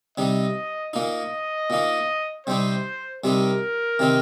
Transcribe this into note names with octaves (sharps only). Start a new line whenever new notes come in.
C3 G3 D#4 D#5
A#2 A#3 D#4 D#5
A#2 A#3 D#4
C3 G3 C4 D#4 C5
C3 G3 C4 D#4 A#4
C3 D#3 C4 D#4